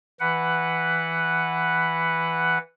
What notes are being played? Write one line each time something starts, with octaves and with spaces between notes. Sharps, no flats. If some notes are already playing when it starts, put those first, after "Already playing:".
E3 B4 F#5